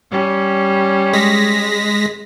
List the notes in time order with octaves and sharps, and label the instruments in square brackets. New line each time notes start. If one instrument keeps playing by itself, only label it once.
[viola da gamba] G3 C#4
[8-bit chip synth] G#3 A#6 B6